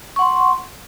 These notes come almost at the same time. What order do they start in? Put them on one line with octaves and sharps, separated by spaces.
C#6 F#5 C6